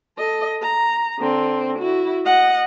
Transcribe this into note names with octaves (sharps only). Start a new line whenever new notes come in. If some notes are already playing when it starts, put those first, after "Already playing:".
A4 D#5
A#5
D3 C4
E4 F#4
D#5 F#5